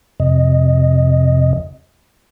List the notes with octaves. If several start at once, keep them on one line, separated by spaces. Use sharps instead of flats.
F2 C3 D#5